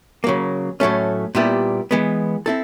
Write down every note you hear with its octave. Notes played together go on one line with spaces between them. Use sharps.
C#3 F#3 A#3
A2 F#3 A3 C#4
A#2 G3 B3 E4 G4
E3 G#3 B3
C4 E4 A4